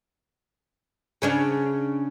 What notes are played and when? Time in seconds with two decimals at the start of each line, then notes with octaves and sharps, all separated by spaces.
1.22 C#3 C#4 D4